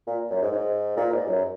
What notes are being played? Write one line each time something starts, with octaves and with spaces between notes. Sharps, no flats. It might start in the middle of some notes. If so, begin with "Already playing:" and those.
A#2
F#2
G#2
G#2
A#2
G#2
F#2